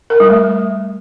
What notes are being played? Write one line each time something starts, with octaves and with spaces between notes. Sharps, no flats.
A#4
G3
A3